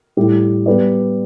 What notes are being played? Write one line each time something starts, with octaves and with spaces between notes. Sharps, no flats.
A2 G3 E4 G4
G3 B3 G4 B4 D5